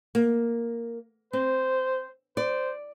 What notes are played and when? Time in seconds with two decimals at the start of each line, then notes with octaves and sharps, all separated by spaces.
0.15 A#3
1.33 C4 C5
2.37 C5 D5